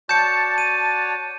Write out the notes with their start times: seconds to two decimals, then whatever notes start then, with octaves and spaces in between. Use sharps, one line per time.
0.09 F#4 C#5 D5 A5 G6 C#7
0.58 D#7